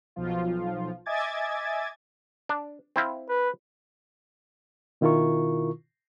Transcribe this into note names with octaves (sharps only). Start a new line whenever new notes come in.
B1 F3 F4
D#5 E5 G#5 D6 G#6 A6
D4
C4 E4 F5
B4
B2 D#3 E4 F4 A#4 C#6